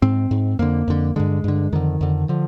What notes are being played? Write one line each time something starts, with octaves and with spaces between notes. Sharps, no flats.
G#2 C4
G#2
F2 D3 A#3
F2 D3
G2 D3 G#3
G2 D3
F2 D3 D#3
F2 D3
D3 F3